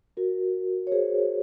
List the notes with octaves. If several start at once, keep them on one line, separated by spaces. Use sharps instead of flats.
F#4 A#4
C#5
G#4 C5